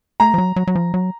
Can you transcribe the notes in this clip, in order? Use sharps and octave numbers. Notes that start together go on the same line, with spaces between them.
A3 A#5
F3
F#3
F#3
F#3
F3
F#3